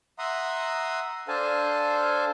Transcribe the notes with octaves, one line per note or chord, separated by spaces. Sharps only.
E5 F#5 A#5 C6 D#6
D4 A4 C5 F5 G#5 A5